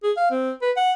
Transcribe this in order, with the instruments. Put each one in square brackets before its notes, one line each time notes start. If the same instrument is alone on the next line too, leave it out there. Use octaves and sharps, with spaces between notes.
[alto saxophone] G#4
F5
C4
B4
F#5